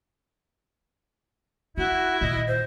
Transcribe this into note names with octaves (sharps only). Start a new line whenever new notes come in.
D4 E4 F#4
A#2 D#3 D#5
C5